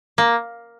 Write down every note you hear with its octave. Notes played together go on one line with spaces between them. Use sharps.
A#3